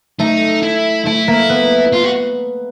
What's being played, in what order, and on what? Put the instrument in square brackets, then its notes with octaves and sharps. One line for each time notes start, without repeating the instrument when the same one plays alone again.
[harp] A3 [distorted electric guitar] D#4
[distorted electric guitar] E4
[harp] A3 [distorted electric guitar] E4
[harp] A#3
B3
[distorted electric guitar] F4
F#4